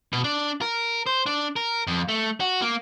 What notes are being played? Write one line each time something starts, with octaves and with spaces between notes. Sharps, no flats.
B2
D4
A#4
C5
D4
A#4
F2
A3
F#4
A#3